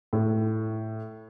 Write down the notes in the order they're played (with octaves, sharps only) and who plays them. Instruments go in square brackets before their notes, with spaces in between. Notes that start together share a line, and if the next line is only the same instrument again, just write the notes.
[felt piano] A2